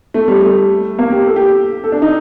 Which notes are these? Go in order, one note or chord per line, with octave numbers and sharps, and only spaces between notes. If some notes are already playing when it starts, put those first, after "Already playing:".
A3
G3
A3
A#3
G4
A4
G4
A4
D4
D#4